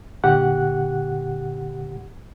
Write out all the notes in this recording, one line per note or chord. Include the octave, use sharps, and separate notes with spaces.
A#2 D3 G4 F#5 F#6